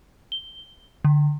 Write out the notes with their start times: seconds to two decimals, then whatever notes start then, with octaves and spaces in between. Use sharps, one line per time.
0.32 G7
1.05 D3